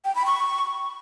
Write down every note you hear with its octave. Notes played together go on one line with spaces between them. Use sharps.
G5
B5
C#6